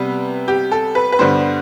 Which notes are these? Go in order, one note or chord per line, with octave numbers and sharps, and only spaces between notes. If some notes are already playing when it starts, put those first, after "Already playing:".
Already playing: C3 G3 B3 B4
G4
A4
B4
B4
G2 D3 G3 B3 C5